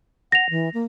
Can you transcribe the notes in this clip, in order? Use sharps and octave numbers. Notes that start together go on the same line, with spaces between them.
F#5 A#6 F7
E3
A#3